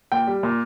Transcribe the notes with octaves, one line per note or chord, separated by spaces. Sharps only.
A#2 G5
G3
A#2